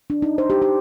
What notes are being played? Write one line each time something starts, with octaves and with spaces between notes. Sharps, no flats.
D4
D#4
C5
G4
G4